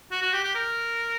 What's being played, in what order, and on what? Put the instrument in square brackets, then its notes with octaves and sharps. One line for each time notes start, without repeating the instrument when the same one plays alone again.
[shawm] F#4
F#4
G4
G4
A#4